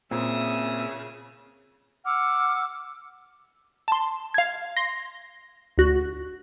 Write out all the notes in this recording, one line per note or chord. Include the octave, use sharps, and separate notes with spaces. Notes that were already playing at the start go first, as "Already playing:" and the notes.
A#2 C#3 C4 E5 D#6
F#5 D6 E6 F6
A5 C6
F5 G#6
C6 A#6 C7
D2 F#4